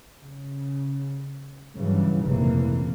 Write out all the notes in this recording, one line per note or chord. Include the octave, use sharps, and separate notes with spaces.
C#3
G2 C#3 E3 F#3
F1 A#1 C#3 E3 A#3